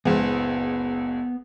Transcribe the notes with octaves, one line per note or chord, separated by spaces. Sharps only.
F#1 C#2 B3